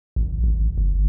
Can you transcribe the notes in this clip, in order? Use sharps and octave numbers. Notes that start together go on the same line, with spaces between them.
G#1
G#1
G1